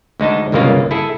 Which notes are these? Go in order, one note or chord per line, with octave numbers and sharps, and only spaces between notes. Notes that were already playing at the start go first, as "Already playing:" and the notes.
D2 G#3 D#4 A5
G1 C2 C#3 G#3 A#3 F4
E4 G#4 A4